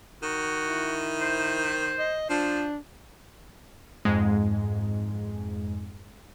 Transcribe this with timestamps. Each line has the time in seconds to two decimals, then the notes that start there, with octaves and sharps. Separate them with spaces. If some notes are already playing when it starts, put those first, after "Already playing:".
0.23 D#3 F#4
0.67 E4
1.21 C5
1.99 D#5
2.30 F3 D4 C5
4.05 F2 G#2 G#3